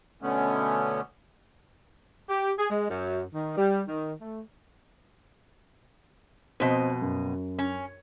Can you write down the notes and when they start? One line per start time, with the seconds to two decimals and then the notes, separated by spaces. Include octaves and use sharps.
0.22 B2 D3 A3 B3 C#4
2.29 G4
2.58 G#4
2.70 G#3
2.89 F#2
3.34 D#3
3.57 G3
3.88 D#3
4.20 A3
6.60 F2 B2 C4 D#5
7.02 F#2
7.59 C#4